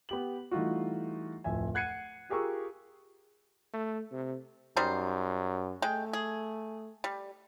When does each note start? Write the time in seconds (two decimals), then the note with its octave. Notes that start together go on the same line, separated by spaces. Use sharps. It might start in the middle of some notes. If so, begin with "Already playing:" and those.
0.09 B3 G4 F#7
0.51 E3 G3 A3 D#4 F4 F#4
1.44 D1 F2 E5 G#5
1.74 F#5 F#6 G#6 C7 C#7 D#7
2.29 F4 G4 G#4 A#4 C#6 E6
3.73 A3
4.12 C3
4.76 F#2 G3 D#4 C5
5.82 G#3 A3 G5
6.13 G#4
7.04 G3